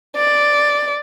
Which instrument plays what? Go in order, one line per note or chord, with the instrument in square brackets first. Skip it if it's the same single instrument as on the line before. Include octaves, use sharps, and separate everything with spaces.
[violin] D5